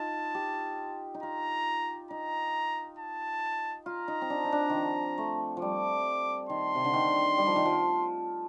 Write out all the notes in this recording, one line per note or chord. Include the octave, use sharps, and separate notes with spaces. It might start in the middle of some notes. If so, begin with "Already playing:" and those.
Already playing: D#4 F4 A5
G4
D#4
F4 A#5
D#4 A#5
A5
F4 A#5
D#4
C4
D4
D#4
D4
D#3 F3
A3
F3
G3 D6
D#3 C6
C3
D3
D#3
G3
F3
D#3
F3